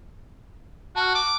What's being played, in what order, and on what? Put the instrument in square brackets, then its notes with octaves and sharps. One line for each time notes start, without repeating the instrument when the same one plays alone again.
[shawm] F#4 [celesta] A5 F6
[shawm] D6